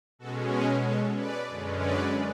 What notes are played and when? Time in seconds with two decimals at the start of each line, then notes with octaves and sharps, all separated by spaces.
0.19 B2 G#3 C#4 F#4 A4
0.51 G#4 B4
0.83 A4 C#5
1.16 B4 D5
1.48 F#2 D3 G#3 C#4
1.79 B4 D5